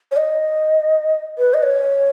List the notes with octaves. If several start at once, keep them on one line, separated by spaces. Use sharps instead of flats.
C#5
D#5
B4
D#5
C#5